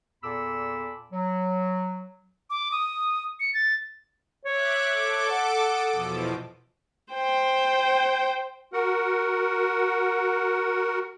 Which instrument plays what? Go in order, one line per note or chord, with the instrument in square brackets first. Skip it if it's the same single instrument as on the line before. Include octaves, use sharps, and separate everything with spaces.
[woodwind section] E2 A#2 A4 B5 D6 E6
F#3
[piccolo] D6
D#6
C#7
A6
[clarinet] C#5 [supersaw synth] E5 D6 F#6
[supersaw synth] A4 D6
[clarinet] F#5
[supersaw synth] D#6 E6 D7
E2 B2 F3
[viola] C5 G5
[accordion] F#4 A#4 F#5